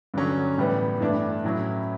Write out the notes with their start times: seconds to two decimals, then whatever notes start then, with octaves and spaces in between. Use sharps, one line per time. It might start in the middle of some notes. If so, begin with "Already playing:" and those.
0.14 G2 D3 F#3 C#4
0.58 A2 E3 G3 B3
1.00 G2 E3 A3 D4
1.44 A2 F#3 C#4 E4